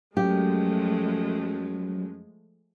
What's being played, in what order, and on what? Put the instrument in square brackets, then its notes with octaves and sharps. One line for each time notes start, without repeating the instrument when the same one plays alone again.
[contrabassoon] F#2 [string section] F3 G#3 A3 [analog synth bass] F#3 [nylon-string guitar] G4